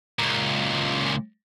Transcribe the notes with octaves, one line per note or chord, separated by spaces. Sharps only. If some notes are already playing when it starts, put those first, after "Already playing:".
C#2 A#2